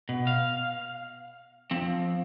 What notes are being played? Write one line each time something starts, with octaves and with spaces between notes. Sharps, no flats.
B2
F5
F3 C4